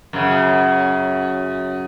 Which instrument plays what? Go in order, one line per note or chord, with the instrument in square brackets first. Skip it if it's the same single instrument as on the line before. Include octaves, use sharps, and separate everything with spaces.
[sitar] F#2 C#3